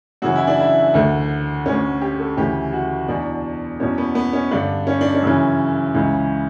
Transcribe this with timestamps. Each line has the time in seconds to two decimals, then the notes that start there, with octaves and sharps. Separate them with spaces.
0.22 F#2 C#3 E3 F#4
0.36 E4
0.47 D4
0.60 E4
0.94 D2 D3
1.66 D2 D3 C#4
2.01 G4
2.19 A4
2.37 D2 C#3 E3 G4
2.73 F#4
3.08 E2 B2 D4
3.80 E2 B2 C#4
3.98 B3
4.15 B3
4.33 C#4
4.51 G2 D3 D4
4.87 C#4
5.01 D4
5.15 C#4
5.22 F#2 C#3 E3
5.94 C#2 C#3 E3